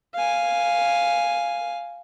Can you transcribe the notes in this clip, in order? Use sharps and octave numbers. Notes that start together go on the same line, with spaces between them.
F5 G#5